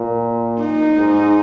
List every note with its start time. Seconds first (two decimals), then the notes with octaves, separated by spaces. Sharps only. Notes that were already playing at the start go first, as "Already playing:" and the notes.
Already playing: A#2
0.60 D#4
0.98 G#2